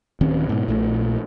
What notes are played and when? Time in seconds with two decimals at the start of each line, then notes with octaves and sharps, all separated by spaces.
0.21 D1 D#3 C4 C#4
0.49 G#2 B2
0.68 A#1 A#2 A3